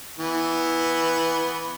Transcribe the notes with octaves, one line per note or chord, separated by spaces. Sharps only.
E3 B3